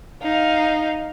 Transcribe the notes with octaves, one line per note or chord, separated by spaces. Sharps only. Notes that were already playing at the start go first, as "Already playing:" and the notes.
D#4 F5